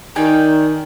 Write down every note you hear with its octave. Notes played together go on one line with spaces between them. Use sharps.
D#3 D#4 D5 G5 G#5